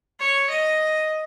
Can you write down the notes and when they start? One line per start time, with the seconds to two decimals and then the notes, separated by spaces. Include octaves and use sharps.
0.20 C#5
0.50 D#5